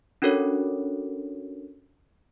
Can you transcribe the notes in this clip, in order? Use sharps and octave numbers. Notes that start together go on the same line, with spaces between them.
C#4 D4 F#4 A4 A#4 C#5